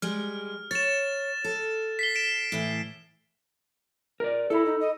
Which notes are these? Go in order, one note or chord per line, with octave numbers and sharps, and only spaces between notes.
G3 G#3 F6
C#5 A6 E7
A4
B6 C7 G7
B6 D7 E7
A2 E3
A#4 D5
E4 A4 B5
D#4
D#5